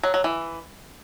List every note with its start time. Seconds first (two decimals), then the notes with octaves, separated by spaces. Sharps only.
0.03 F#3
0.14 F#3
0.24 E3